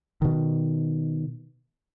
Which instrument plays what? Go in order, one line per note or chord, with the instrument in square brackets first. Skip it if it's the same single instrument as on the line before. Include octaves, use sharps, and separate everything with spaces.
[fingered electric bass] B2 D#3